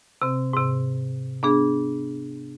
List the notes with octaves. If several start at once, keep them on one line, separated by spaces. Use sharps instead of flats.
C3 C4
G#2 C3
B3 D4 G#4